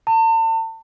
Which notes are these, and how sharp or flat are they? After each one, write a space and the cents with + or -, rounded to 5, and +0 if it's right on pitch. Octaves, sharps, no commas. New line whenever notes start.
A5 +40